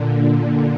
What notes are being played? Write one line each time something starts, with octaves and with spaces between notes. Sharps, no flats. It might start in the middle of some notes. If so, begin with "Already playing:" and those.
Already playing: A#2 D3
A#2